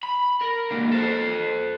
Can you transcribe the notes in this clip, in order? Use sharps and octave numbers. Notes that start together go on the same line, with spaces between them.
B5
A#4
C#2 A#3
A4 C5